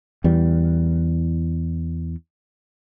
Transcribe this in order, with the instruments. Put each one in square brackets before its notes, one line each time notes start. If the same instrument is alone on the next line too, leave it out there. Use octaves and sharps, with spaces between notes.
[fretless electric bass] E2 E3 G3